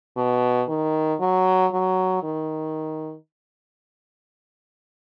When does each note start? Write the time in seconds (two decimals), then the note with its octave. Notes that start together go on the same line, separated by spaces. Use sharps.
0.17 B2
0.68 D#3
1.20 F#3
1.72 F#3
2.23 D#3